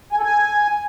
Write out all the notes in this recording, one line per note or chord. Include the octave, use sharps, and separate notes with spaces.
G#5
A4
G#5